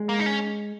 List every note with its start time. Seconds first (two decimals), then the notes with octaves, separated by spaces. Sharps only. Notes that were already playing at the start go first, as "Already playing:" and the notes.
Already playing: G#3
0.09 A#3
0.19 D#4
0.26 C#4